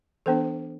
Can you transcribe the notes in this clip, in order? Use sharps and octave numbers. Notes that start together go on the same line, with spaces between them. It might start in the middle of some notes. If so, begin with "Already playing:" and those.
E3 B3 D4 A4 C5